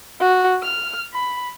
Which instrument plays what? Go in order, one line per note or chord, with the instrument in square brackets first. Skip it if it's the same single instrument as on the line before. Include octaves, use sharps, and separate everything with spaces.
[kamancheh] F#4
F6
B5